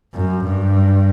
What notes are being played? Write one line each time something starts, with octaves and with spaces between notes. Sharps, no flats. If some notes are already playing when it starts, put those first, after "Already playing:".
F#2
G2